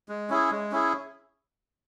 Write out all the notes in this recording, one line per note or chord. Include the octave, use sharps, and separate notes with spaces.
G#3
C#4 E4 G#4
G#3
C#4 E4 G#4